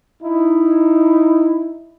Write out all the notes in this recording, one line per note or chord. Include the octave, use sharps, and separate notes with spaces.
D#4 E4